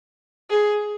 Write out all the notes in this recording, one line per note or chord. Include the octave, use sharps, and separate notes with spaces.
G#4